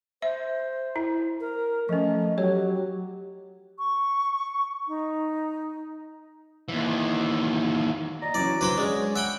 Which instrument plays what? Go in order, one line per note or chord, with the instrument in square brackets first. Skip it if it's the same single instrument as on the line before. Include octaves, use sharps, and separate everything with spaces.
[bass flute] C5 [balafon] E5
[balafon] E4
[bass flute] A#4
[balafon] F3 C#4 [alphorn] A3 [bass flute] D#5
[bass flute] F#3 [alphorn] G4 [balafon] C#5
[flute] C#6
D#4
[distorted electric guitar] D#2 E3
[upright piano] D5 D#5 [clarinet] A#5
[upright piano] E3 F#3 C#4 [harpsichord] D5
[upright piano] D3 F#3 [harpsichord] B4 C5 B5 [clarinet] D6
[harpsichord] G#3 [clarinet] C#4 [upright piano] C#5 D5
[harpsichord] E5 G5 B5 [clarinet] F#5